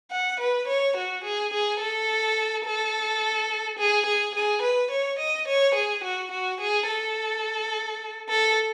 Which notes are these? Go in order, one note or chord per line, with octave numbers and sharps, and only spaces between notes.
F#5
B4
C#5
F#4
G#4
G#4
A4
A4
G#4
G#4
G#4
B4
C#5
D#5
C#5
G#4
F#4
F#4
G#4
A4
A4